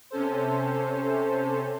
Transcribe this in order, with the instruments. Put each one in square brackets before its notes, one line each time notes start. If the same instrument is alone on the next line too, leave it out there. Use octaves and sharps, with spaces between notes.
[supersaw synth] C3 C#4 A4 C5